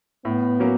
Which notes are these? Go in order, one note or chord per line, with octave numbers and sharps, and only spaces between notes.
A2 B3
F#3 A#3 C#4